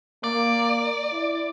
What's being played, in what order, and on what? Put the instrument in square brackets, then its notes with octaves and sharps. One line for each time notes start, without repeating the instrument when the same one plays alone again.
[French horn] A#3 [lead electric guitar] D5
[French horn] E4